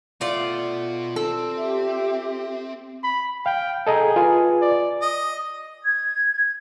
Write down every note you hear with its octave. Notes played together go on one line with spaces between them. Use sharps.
B2 A3 F4 D5 F#5
C4 A4
G4 E5
B5
F5 G5
G#4 A4 D#5 A#5
F4 B4 G#5
D5
D#5
G#6